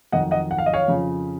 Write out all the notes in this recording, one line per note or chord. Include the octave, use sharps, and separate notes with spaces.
F2 D#3 F#3 D#5 F#5
D#5 F#5
F#5
F5
D#5
C#5 F5
F2 C#3 F3